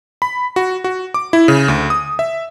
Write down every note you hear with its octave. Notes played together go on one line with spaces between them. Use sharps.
B5
F#4
F#4
D6
E4
C#3
D2
D#6
E5